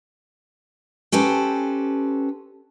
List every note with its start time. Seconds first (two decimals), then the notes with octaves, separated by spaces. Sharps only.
1.12 C#4 G4 A4 B4 C5